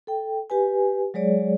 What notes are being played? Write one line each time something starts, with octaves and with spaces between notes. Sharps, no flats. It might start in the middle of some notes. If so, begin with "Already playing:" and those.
A4 G5
G4 B4 G#5
F#3 G#3 G#4 C#5 D5